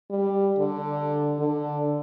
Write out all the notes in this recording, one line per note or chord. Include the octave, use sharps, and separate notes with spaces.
G3
D3
D3